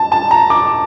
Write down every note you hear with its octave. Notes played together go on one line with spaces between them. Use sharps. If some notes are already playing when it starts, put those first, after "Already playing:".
Already playing: A5
A5
A#5
D6